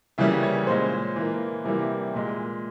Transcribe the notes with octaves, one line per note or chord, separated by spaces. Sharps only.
C#3 E3 G3 A#3 E5
C#5
A#2 G#3 C5
E3 A#3
C3 E3 G3 A#3
A#2 G#3